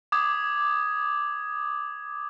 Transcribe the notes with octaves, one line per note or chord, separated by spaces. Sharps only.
D6 D#6 G#6